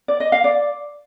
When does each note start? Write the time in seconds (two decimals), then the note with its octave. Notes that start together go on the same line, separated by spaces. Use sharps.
0.08 D5
0.20 D#5
0.32 F5
0.44 D5